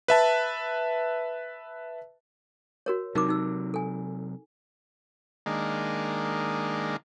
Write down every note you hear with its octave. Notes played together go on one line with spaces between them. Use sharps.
B4 E5 A5
F#4 A#4 C#5
C3 F#3 D#4 A#4 D6
D#4 E6
A4 G#5
D#3 G#3 A#3 D4